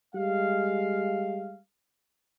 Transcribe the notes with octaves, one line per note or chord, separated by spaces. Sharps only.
G3 G#3 F5